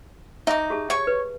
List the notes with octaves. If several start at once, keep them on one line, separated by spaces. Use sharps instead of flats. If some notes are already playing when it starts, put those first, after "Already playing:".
D#4 E5 D6
G4 G#4 A5
C#5 C#6
B4